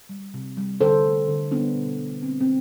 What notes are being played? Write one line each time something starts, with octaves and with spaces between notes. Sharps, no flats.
G3
C3
G3
D3 A4 C5
A3
D3
G3 B3 D4
B2
G3
A3 C4
C4